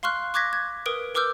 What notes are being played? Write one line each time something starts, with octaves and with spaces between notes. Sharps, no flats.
F5 C6 C#6 F6 F#6
C#6 D6 F#6 G#6 A#6 B6
G#6
A#4 B4 D#6 D7
A#4 B4 D6 E6 F6 G6